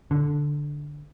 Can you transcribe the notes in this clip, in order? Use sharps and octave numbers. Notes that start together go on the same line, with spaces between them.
D3